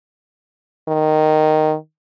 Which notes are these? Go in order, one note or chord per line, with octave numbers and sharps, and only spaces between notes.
D#3